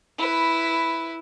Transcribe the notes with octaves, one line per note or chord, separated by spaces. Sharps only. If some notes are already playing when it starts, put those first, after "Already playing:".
E4 B4